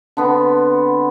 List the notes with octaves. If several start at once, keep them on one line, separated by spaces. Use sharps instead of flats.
D3 B3 C4